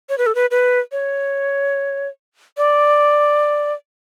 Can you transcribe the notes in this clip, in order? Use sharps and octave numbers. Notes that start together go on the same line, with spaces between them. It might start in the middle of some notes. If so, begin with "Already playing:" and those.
C#5
B4
A4
B4
B4
C#5
D5